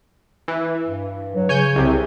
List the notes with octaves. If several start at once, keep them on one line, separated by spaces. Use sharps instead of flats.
E3
G2
F#3
C#3 C#5 G#5 G6
C2 C3